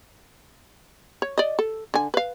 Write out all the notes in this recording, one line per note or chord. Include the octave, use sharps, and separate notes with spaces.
C#5
D5 D#5
A4
D3 G#5
B4 F5